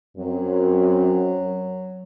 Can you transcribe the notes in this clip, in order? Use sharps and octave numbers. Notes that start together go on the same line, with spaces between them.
F#2 F#3 C4